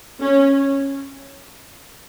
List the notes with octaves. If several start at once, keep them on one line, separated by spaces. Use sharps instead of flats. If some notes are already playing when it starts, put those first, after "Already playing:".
C#4